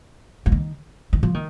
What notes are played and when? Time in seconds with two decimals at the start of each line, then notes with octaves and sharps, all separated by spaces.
0.46 F3
0.52 D#3
1.13 D#3
1.23 F3
1.34 D#3